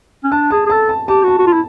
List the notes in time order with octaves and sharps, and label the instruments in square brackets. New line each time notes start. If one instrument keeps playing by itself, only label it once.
[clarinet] C#4
[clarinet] D4 [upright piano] A5
[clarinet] G#4 [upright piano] A5
[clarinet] G#4
[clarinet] A4 [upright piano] A5
[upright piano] A5
[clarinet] G4 [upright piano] A5
[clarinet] F#4 [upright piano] A5
[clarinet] F#4
F4
E4